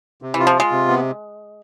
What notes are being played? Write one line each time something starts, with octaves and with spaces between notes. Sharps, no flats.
C3
E3
F4
F3
G#3 F4
C3
B3